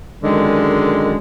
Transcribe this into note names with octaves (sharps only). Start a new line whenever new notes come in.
F#2 D3 D#3 G#3